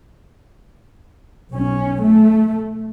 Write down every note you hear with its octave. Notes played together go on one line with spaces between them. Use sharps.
B1 C#4
A3